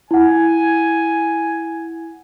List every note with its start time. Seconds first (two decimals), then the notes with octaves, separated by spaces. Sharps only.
0.11 E4 F#5 G#5